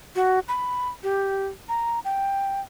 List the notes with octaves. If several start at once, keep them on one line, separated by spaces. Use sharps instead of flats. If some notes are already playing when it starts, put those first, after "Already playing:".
F#4
B5
G4
A#5
G5